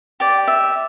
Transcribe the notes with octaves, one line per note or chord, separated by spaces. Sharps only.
G4 D5
E5